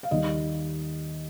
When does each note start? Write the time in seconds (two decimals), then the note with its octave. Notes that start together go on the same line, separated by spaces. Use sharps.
0.03 F5
0.11 D#2 D#3 G3 D#5